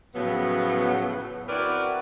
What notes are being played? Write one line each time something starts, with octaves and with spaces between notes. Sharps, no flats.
A2 C#3 F3 F#3 B3
C4 E4 F#4 A#4 B4 D5